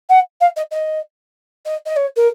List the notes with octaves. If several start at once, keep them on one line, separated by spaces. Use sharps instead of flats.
F#5
F5
D#5
D#5
D#5
D#5
C#5
A#4